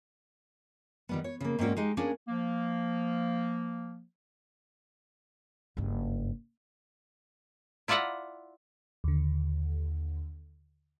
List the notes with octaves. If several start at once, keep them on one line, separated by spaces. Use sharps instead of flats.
D#3 G3 B3
C#5
C#3 A#3
G#2 A#3 C4 C#4 F#4 D5
G#3 D#4 G4
A#3 C#4 D4 G#4
F3 A#3
F#1 G2
E4 F4 D5 E5 F#5 A#5
D#2 D3